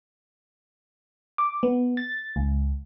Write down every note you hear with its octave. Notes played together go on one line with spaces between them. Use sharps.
D6
B3
A6
C#2